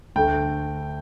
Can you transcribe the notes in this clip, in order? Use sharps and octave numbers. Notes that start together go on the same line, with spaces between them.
D2 D3 A3 G5